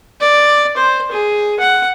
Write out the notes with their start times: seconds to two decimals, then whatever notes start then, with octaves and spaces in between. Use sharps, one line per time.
0.21 D5
0.77 C5
1.12 G#4
1.60 F#5